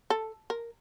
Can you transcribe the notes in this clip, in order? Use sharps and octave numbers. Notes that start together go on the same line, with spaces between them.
A4
A#4